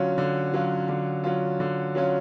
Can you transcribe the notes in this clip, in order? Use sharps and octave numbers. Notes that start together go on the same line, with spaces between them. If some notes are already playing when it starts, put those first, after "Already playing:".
Already playing: D3 F#3 C#4 F4
D3
F#3 C#4 F4
D3
F#3 C#4 F4
D3
F#3 C#4 F4